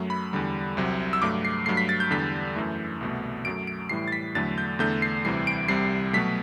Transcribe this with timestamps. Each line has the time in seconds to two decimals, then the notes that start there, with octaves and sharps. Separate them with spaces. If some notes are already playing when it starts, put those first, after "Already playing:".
Already playing: F#2 F#3 A3
0.10 B5
0.33 E2 D3 G3
0.77 C2 C3 F#3
1.13 E6
1.22 G2 F#3 A3 D6
1.45 C7
1.66 G2 F#3 A3 C7
1.77 B6
1.89 A6
2.00 G6
2.11 E2 D3 G3 B6
2.56 F#2 E3 A3
3.01 C2 B2 A3
3.45 F#2 F#3 A3 D7
3.67 D7
3.89 A2 E3 G3 C7
4.08 A6
4.12 B6
4.35 E2 D3 F#3 A3 A6
4.58 G6
4.79 E2 D3 A3 G6
5.02 C7
5.25 D2 C3 E3 G3 C7
5.47 D7
5.68 C2 C3 G3 C7
6.13 B2 F#3 A3 B6